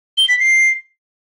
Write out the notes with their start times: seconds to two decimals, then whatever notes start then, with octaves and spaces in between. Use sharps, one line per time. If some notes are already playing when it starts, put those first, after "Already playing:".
0.18 G7
0.29 B6
0.40 C7